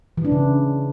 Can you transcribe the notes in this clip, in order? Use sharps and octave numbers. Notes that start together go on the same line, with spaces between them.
E3
D4
C#3